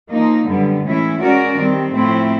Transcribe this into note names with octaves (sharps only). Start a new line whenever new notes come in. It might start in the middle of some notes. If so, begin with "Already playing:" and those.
F3 A#3 D#4
F#2 D3 G3 B3
A2 E3 G#3 C#4 E4
G#3 C#4 F#4 A#4 D5
D#3 G3 C4
A2 F3 A3 C4 E4